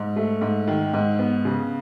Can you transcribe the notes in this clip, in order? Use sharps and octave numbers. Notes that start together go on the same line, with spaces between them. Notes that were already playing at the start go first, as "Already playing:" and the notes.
Already playing: G#2
A3
G#2
D#3
G#2
B3
C#3